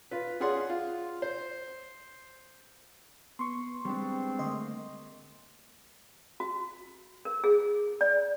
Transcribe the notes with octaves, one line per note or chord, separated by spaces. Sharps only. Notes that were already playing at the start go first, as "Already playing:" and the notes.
F4 B4
C#4 F4 G#4 D5 F#5 C6
F4
C5
B3 C6 C#6
G3 G#3 B3 C4 D4
D3 A3 A#3 D#5 C6
F#4
A#4
G#4
D5